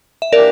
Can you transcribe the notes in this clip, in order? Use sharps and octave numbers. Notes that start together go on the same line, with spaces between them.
E5
E3 A#3 D4 G4 A#4 D5